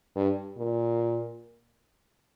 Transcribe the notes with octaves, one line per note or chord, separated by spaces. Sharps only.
G2
A#2